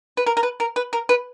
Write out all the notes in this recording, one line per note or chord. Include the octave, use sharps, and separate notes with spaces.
B4
A#4
A#4
B4
A#4
B4
A#4
B4